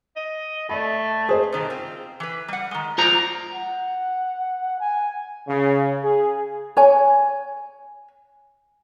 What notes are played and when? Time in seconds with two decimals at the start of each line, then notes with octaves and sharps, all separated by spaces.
0.16 D#5
0.69 A3 D5 B5
1.29 G#4 C5 D#5
1.52 B2 D#3 G3
1.70 C4 F4
2.20 E3 B4
2.48 G3 F#5
2.71 D#3 G#3
2.98 G#3 F4 C5 D5 A#5
3.53 F#5
4.80 G#5
5.47 C#3
6.03 G#4
6.77 C#5 G#5